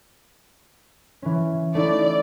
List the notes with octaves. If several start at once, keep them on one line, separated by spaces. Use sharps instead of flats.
E3 C#4
A3 D#4 E4 D5